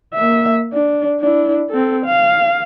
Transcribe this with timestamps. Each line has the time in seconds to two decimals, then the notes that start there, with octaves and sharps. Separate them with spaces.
0.14 A#3 E5
0.73 D4
1.20 D4 E4
1.70 C4 A4
2.05 F5